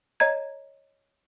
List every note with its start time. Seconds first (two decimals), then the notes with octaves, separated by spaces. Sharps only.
0.20 C#5 D#5 A#5 G#6